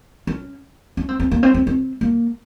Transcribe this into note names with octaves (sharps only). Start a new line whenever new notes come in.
C#4
C#4
C4
C4
A#3
C4
C4
C4
A#3